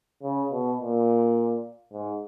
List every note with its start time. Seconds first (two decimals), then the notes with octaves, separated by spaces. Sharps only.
0.23 C#3
0.51 B2
0.80 A#2
1.93 G#2